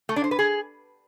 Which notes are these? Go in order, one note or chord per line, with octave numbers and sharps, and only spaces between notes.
A3
D4
C5
B4
G#4